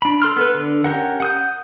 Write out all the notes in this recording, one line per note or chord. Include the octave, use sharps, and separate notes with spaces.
D4 B5
A4 C6 F6
B3 A4 B4
D3
C#4 G4 A#4 F#5
F#5 D#6 G6